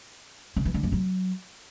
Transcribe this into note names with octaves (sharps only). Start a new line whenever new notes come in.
C#3
E3
D3
F#2
F#3